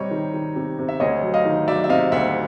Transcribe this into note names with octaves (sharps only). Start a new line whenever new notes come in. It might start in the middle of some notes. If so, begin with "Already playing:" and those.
Already playing: C3 G3 C#5 D#5
D#3
D#3
C3
C3
E5
D2 C#5 D#5
F#3
D#5 F5
D#3
F#3 D5 E5
E5
C3 D#5 F5
D2 E5 F#5